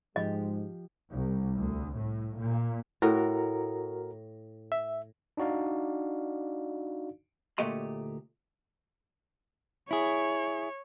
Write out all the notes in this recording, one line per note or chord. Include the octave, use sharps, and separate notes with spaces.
G#2 F3 G#3 G4 D#5
C2
D2
A2
A#2
A2 F#4 A#4 A#5
E5
D4 D#4 F#4 D5 F5
D2 A#2 A3 G4 D#5 C6
E4 G#4 C#5